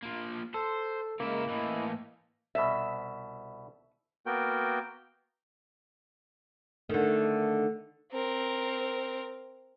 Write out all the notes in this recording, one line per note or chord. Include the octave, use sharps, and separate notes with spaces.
F3 A#3
A4 C5
C#3 G#3 A#3 E4 A#4
A2 E3 E4 D#5
C2 B2 E5
A#3 B3 F#4 A#4 G5
D3 D#3 A3
C4 A#4